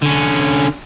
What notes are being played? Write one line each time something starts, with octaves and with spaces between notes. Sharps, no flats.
D3 C#4